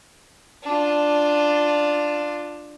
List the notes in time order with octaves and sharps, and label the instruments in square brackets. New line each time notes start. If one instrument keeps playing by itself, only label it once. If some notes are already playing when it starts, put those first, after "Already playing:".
[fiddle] D4 F4